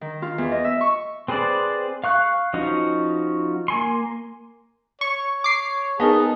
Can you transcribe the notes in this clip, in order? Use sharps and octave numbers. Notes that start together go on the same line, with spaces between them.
D#3
F4
E2
D#5
E5
C#6
C4 G#4 B4 C5 D5
F5 C#6 F#6
F3 C#4 D#4 F#4
A#3 G#5 C6
C#5 C#6
D6 C7
B3 D#4 G#4 A#4 A5